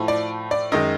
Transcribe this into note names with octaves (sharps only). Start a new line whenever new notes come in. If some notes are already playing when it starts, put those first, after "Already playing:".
Already playing: A2 F3 A3
D5
D5
F#2 D#3 G#3 D#5